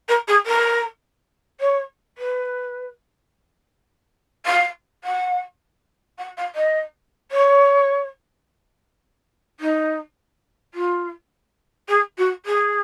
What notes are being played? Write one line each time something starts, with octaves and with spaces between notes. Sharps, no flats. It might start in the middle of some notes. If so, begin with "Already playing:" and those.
A#4
G#4
A#4
C#5
B4
F5
F#5
F#5
F5
D#5
C#5
D#4
F4
G#4
F#4
G#4